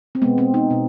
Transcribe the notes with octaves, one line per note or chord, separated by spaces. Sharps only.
C4
B2 G#3 B3
C4
D#4
B2